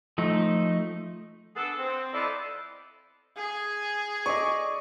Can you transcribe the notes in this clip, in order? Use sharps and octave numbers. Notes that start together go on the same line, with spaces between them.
F3 A3 D#4
B3 D4 G#4 A4
C4
F3 B3 E4 A4 D5 D#5
G#4 G#5
D5 D#5 C#6